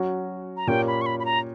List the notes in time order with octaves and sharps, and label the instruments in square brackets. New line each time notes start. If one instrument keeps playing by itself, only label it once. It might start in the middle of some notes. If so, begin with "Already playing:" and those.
Already playing: [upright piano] F#3 C#4 F#4
[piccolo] A#5
[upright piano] A#2 A#3 C#4 G4 [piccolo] G5
[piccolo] B5
C#6
B5
B5
A#5